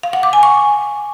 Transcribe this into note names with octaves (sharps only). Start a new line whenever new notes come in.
F5
F#5
D6
G#5
C#6